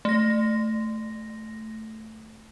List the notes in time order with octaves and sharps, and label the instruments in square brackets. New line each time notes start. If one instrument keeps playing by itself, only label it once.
[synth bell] A3 A#6